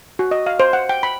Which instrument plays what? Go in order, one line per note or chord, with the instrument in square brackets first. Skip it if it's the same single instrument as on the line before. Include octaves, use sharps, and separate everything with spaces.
[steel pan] F#4
D#5
F5
C5
F#5
G5
B5